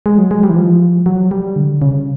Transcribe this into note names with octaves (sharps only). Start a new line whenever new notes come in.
G#3
F#3
G#3
G3
E3
F3
F#3
G3
D3
C#3